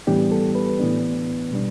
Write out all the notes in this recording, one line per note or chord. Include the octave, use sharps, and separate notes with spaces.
A2 E3 G3 B3 D4 G4
A4
B4
A2 E3 B3 D4
B2 G3 D4